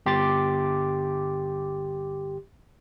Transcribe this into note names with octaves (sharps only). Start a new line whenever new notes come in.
G1 G4 C6 D6 A6